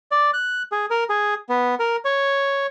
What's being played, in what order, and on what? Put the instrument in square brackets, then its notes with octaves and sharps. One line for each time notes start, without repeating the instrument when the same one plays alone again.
[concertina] D5
F#6
G#4
A#4
G#4
B3
A#4
C#5